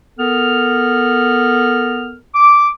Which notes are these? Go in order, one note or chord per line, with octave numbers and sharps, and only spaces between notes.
B3 A4 A#4 F6
D6